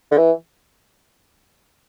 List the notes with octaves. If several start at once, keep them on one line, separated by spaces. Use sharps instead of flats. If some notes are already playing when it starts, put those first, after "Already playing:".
D3
E3